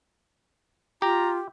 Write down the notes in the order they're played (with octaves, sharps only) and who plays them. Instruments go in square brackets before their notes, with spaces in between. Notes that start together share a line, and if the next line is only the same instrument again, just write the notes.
[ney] F4 [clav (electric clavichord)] G4 [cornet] A#5